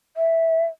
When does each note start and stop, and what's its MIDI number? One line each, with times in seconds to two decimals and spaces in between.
0.17 0.65 76